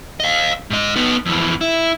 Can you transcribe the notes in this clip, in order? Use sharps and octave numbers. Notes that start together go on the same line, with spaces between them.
D#5 F5
G#2 D#5
B3 D#4
F2 E3
E4